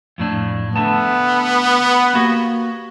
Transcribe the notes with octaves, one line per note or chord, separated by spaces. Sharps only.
F2 A2 D4
D3 A3 B3 A5
A#3 F#4 G4